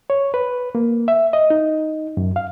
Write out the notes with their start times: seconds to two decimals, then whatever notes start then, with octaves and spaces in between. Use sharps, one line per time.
0.10 C#5
0.34 B4
0.75 A#3
1.08 E5
1.33 D#5
1.50 D#4
2.17 F#2
2.36 F5